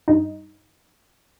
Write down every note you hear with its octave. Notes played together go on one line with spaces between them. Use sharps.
G2 D#4